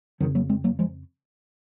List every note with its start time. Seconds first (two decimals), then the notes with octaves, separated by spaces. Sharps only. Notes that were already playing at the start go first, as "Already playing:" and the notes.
0.20 F2 D#3 F#3
0.23 C#3
0.35 F#3 A#3
0.49 G#3 C4
0.64 F#3 A#3
0.79 F3 G#3